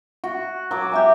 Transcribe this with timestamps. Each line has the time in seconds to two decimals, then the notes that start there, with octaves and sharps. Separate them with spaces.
0.24 F#4
0.71 F#3 D6
0.91 G4 E5 G#5